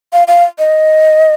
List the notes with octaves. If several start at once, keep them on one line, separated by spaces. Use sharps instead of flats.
F5
F5
D#5